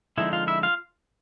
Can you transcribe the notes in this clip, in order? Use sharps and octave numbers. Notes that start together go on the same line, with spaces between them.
D3 F3 G#3 C4 D#4 E4 E5
F4 F5
E4 E5
F4 F5